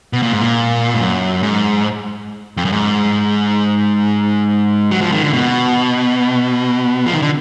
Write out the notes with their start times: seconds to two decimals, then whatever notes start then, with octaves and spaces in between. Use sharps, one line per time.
0.13 B2
0.22 A#2
0.32 G#2
0.41 A#2
0.94 G#2
1.00 F#2
1.43 G#2
2.57 F2
2.65 F#2
2.72 G#2
4.91 F#3
5.01 F3
5.12 D#3
5.22 D3
5.33 B2
7.06 F3
7.14 D#3
7.22 D3